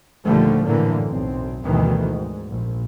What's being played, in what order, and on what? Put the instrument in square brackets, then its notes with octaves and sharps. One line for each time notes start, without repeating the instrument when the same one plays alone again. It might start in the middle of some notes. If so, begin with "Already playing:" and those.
[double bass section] A#1 D#2 D3 F3 G3 A3
F#2 A2 D3 E3 A#3
B1 C4
D2 G2 B2 D#3 E3
G#2
A#1